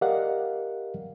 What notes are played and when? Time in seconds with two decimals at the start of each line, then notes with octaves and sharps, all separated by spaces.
0.01 G4 A#4 D5 D#5 F5 F#5